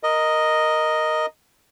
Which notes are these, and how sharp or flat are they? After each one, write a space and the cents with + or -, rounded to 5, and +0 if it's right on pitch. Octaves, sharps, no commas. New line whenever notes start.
A#4 +0 D#5 +0